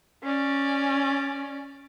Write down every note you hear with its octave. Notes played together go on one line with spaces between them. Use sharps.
C#4 D5